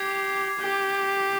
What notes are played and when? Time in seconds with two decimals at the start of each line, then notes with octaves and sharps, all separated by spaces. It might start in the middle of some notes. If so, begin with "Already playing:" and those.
Already playing: G4 D6 G#6 C7
0.59 G4